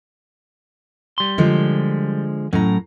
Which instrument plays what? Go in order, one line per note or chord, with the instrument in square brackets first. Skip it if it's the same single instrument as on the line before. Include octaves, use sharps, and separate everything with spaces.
[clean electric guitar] G3 C6
[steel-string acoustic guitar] D3 F3 G#3
[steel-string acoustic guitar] A2 A#5 [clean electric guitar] F#3 C#4